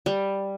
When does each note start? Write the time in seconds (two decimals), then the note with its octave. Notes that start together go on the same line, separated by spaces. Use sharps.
0.06 G3